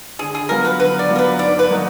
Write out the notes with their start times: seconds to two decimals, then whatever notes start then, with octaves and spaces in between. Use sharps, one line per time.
0.19 D3 G#4
0.35 G#4
0.49 F#3 B3 F4 A#4
0.65 B4
0.79 D3 B4
0.99 D5
1.09 F#3 B3 F4
1.16 A#4
1.19 B4
1.39 G#2 D5
1.59 B4
1.70 D#3 F#3 A#3 D#4